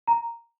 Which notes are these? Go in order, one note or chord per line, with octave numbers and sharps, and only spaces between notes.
A#5